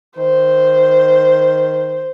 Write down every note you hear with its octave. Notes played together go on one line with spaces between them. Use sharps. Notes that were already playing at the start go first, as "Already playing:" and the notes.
D#3 C5